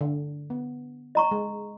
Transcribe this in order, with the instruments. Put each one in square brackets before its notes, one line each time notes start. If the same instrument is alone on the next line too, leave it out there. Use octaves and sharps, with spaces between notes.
[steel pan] D3
B3
[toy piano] D#5 A#5 C#6
[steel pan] G#3